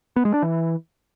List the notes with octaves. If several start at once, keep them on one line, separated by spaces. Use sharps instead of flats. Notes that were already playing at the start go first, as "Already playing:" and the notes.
B3
G#3
D4
E3